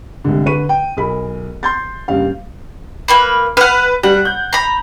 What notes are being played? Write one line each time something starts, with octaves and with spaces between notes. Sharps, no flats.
C2 G#2 D3
D3 B4 C#6 D#7
G5
B1 G#4 A#4 B5
C6 G6 A6
F#1 G2 F5
A#3 B4 B5
B4 F#5 F6
G3 F#5
G6
A#5 B5